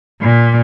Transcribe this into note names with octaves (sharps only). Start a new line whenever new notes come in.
A#2